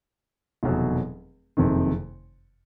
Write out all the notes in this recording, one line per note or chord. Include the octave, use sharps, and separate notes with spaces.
F1 E2 B2 F#3
F#1 F2 C3 D#3